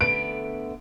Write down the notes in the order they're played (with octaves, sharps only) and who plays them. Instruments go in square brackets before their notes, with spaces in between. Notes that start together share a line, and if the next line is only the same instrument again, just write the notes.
[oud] D3 A3 B3 [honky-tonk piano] D7